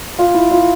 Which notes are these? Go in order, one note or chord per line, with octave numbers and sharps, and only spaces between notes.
F4
E4
F4